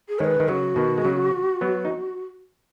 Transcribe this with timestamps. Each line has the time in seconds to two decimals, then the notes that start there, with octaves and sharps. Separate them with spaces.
0.09 G#4
0.19 D#3 G#3 B4 C#5
0.40 D#3
0.48 C#3 F#3 F#4
0.76 B2 D#3
0.98 G#3
1.05 C#3 F#3
1.61 F#3 B3
1.85 D#4